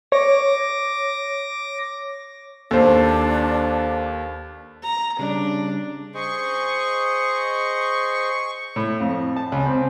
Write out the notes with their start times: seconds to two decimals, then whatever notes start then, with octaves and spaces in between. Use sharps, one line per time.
0.12 C#5 D6 A#6
2.71 D#2 D4 A4 C5
4.83 A#5
5.19 C#3 G3 C#4 D4
6.14 G#4 C5 D#5 C#6
8.76 A2
9.00 F2
9.36 A5
9.52 C#2
9.66 C4